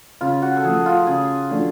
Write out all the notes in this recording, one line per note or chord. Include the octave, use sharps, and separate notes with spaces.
C#3 F4
F#4
A4
F3 A3 G#4
F4
C#3 G#4
F3 A3 D4 F#4